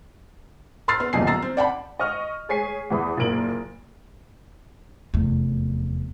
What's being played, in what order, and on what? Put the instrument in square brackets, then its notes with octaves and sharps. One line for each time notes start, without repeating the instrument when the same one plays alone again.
[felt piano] B5 C6 E6 F6 A6 C7
B3
D#1 B1 A#2 F#3 G#5 C7
A#5 E6 A6 C7
C4
D5 F#5 G5 A5 B5
[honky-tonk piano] D#5 C#6 F6
G#4 C#5 G#5 B6 C7
E2 E3 B5 D#6
F#1 A#2 A#3 D7 F#7
[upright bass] F1 E2